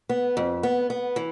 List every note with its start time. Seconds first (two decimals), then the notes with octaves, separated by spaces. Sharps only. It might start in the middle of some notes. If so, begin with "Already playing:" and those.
0.09 B3
0.37 F2
0.63 B3
0.90 B3
1.16 E3